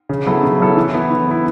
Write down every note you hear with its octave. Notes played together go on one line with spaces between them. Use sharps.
C#3
F#3 B3 E4 A4
C#3
F#3 B3 E4 A4
E3
B3 E4
E3
B3 E4